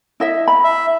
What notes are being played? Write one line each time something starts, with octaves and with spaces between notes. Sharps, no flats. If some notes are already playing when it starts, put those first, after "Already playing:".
E4 D#5 E5
B5
E5